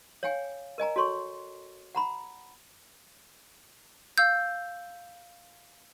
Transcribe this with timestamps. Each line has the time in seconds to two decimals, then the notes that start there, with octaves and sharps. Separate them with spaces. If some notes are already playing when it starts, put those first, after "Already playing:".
0.23 C#5 F5 G5 G#5
0.78 A#4 D#5 G#5 A#5
0.96 F#4 A4 C#5 C6 C#6
1.95 F#5 A#5 B5
4.18 F5 E6 G6